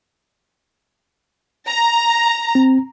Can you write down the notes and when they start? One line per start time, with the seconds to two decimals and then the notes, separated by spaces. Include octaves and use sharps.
1.68 A#5
2.55 C4